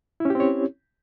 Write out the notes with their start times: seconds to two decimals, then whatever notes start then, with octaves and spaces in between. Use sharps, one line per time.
0.20 E4
0.25 C#4
0.30 G4
0.35 C4
0.40 C#5